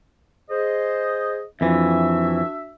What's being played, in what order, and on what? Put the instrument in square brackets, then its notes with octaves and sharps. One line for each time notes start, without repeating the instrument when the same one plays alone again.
[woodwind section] G#4 C5 D#5
[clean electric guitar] F2 E3 [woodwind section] D4 F#4 E5